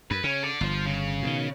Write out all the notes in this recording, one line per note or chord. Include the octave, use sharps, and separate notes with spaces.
F#2 B4
C#3 C#4
A4 D5
G1 F4 C5
C#3
B2 D3 D#3